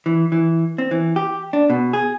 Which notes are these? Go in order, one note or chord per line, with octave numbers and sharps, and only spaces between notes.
E3
E3
C4
E3
G4
D4
B2
G#4